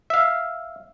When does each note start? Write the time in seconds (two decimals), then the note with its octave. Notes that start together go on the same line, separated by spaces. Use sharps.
0.10 E5 F5